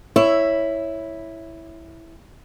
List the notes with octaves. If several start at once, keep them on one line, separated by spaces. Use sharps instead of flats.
E4 C#5